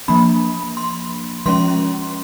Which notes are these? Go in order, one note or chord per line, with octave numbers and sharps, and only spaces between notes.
F3 A#3 D4 B5
C6
F3 G#3 C#4 C6